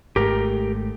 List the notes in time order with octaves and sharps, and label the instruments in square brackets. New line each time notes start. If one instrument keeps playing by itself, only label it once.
[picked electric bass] G#1 G#2 A3 [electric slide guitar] G4 A#4